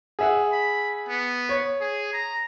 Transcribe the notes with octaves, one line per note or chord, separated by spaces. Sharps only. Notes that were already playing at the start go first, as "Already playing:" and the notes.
G#4 E5 F#5
B5
B3
C#5
G#4
A#5